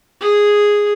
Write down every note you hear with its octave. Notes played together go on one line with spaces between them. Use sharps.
G#4